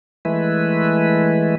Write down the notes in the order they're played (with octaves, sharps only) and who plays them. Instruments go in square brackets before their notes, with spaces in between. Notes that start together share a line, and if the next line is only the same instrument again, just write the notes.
[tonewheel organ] E3 G#3 A3 E4 B4